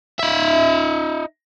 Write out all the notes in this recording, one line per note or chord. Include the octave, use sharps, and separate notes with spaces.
D#4 E5